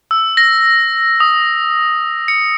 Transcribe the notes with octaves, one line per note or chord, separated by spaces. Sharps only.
E6
A#6
D#6
C#7